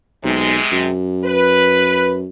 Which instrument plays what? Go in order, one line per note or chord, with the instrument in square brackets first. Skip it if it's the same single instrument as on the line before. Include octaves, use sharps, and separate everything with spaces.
[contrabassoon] B1 [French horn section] C3 G#3
[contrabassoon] F#2
[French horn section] B4